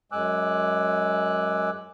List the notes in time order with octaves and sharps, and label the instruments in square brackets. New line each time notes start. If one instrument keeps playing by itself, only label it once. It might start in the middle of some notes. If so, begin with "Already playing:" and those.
[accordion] F#2 G#3 G#5 D6 E6 F#6